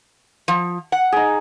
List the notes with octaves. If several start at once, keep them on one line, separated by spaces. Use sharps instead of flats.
F3
F#5
D#4 G#4